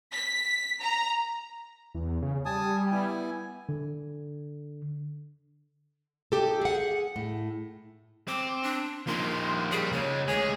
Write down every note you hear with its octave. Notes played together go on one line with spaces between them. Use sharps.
B6
A#5
E2
C#3
G3 G#5 A5 D#6
B3 E4 G#5
D3
D#4 G4 A4
G#4 F#5
A2
C4 D6
D4
A#2 D#3 F3 A#3 C6
G3 G#4
C#3 G#3 C#5
D2 G#3 G#4 C#5